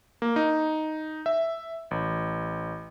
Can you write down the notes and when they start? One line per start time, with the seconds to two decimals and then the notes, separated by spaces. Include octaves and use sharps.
0.22 A#3
0.36 D#4
1.26 E5
1.91 A1